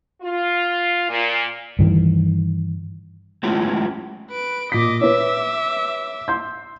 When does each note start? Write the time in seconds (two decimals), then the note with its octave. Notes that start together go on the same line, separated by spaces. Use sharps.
0.22 F4
1.09 A#2
1.79 G2 D#3 E3
3.43 F#3 G#3 A3 C#4 E4 F4
4.30 B4 D7
4.72 A#2 D#5 D6 B6
5.01 B4 C#5 E5 D6
6.28 C6 G6